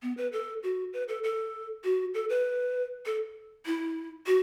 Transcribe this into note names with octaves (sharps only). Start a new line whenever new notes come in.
B3
B4
A4
F#4
B4
A4
A4
F#4
A4
B4
A4
E4
F#4